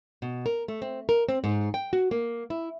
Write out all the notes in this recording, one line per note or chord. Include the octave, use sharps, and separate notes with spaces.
B2
A#4
A3
C4
A#4
C4
G#2
G5
F#4
A#3
E4